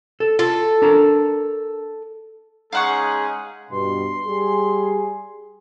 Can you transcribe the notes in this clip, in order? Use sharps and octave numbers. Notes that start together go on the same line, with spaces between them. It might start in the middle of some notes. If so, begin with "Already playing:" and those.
A4
F4 A4
D4 A#4 A#5
G#3 C#4 D#4 G#4 F5 F#5 C#6
G2 B2 C6
G3 G#4